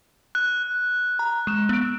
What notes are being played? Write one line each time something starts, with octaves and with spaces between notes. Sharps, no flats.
F#6
A#5
G#3 E7
B3 D7